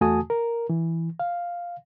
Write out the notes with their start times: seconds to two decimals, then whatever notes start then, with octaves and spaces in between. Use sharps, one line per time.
0.01 E2 A3 F#4 G#5 A5 D#6
0.30 A#4
0.70 E3
1.20 F5